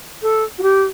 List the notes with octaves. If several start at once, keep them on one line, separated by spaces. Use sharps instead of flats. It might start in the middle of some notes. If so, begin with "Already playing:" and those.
A4
F#4
G4